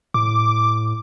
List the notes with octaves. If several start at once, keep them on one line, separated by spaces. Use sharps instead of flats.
A2 D6